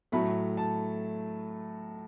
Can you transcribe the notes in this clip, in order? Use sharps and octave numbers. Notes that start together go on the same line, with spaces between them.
A2 F#3 A3 B5
A5